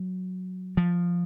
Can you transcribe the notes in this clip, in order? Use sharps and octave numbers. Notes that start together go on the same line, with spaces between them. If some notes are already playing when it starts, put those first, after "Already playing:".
Already playing: F#3
F3